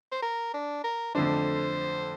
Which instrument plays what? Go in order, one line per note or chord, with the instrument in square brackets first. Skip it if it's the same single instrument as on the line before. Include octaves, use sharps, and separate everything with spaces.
[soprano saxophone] C5
A#4
D4
A#4
[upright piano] F2 D3 A3 D4 [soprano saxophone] C5